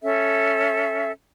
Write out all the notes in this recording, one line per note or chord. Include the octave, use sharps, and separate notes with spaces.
C#4 A4 E5